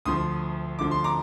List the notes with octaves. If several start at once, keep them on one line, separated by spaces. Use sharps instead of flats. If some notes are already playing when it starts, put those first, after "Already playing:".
D2 D3 F3 C6 D#6
D2 D3 F3 D6
C6
A#5 D6